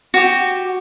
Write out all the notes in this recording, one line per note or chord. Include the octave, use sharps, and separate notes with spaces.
F#4 G4